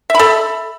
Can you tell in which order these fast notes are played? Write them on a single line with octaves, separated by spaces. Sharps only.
E5 B5 A4